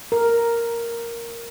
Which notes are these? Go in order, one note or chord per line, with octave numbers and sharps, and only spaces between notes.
A#4